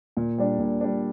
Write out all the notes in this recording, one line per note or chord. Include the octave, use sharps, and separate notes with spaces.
A#2
G3 D4
A#2
G3 D4